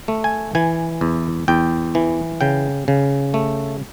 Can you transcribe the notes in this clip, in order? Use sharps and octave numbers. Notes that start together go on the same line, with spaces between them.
A3
G#5
E3 G#5
E2
E2 G5
E3
C#3 G5
C#3
A3